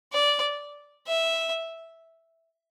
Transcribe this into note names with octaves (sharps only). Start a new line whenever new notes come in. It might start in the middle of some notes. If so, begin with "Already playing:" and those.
D5
E5